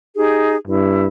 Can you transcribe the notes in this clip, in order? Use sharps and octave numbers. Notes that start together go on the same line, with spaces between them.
D#4 G4 G#4
G2 E4